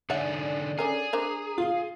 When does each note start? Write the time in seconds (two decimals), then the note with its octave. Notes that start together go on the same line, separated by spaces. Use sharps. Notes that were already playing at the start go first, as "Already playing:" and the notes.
0.10 D3 D#4 G#4 C#5 D5 E5 F#5
0.79 D3 C#4 G#4 A#4
1.13 D4 A#4 C5 A#5
1.58 F4 F5